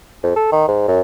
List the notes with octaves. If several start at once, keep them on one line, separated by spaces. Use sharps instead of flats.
F2
A4
D#3
G#2
F#2